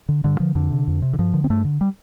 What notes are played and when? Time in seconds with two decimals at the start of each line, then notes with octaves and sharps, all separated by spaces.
0.09 D3
0.24 G2 D3
0.40 D3 F3
0.55 F2 D3
0.71 C3
0.87 F2
1.02 C3
1.13 D3
1.19 G2 F3
1.34 D3
1.44 C4
1.50 G2 A3
1.65 D3
1.81 G3